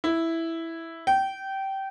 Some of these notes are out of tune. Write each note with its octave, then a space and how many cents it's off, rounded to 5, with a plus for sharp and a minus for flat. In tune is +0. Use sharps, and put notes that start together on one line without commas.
E4 +0
G5 -20